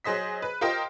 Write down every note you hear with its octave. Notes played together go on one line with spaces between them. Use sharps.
F#3 G#4 C5 D#5 B6
B4
F4 G4 A#4 C5 D#5 G5